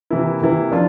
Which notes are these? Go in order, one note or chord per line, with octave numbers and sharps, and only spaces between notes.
C3 E3 A#3 E4
C3 E3 A#3 E4
F3 A#3 D4 F4